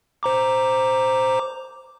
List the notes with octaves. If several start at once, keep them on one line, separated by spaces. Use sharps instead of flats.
C5 A#5 D6